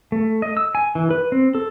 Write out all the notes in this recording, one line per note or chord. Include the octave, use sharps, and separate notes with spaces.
A3
D#5
E6
G#5
E3
B4
C4
A4